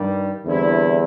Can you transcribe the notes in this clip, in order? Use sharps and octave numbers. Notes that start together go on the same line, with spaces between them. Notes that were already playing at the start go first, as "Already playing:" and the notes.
Already playing: G2 D#3 G3
E2 D3 G3 C4 E4